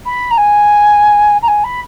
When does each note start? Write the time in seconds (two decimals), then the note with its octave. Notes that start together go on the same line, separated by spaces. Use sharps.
0.06 B5
0.31 A#5
0.37 G#5
1.42 A#5
1.48 G#5
1.64 B5